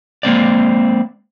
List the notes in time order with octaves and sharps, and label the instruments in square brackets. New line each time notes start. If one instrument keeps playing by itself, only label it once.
[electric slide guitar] G#3 A#3 C4 D5